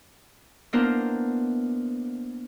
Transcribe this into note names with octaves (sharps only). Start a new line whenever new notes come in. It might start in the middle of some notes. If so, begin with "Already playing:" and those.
A#3 B3 D4 E4 A#4 C5